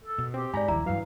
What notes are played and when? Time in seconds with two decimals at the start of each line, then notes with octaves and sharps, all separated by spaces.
0.04 A4
0.18 B2
0.34 C4 G4
0.54 G#2 D5 G#5 A#5 B5
0.68 D#1 A#1 E4 A#5
0.86 G2 E3 F#3 F5